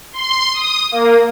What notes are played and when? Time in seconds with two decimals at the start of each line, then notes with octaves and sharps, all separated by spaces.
0.13 C6
0.54 D#6
0.92 A#3